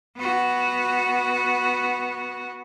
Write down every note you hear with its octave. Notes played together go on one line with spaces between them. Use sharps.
B3 F#4